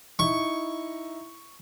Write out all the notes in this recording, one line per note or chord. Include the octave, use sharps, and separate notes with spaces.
D#4 E4 C#6